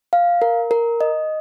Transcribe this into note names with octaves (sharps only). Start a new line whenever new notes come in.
F5
A#4
A#4
D#5